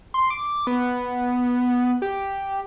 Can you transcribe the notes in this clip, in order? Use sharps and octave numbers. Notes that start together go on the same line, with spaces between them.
C6
D6
B3
G4